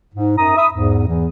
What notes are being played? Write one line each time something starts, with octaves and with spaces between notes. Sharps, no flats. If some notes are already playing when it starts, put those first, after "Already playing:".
G#2
F#2 D#4 A#5 D#6
E5 B5 D#6
E2 G#2
E2 E3